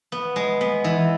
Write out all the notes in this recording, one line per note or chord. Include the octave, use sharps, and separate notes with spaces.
B3
G#3
B3
E3